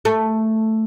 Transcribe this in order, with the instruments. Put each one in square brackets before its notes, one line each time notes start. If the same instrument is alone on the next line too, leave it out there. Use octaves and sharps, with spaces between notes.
[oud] A3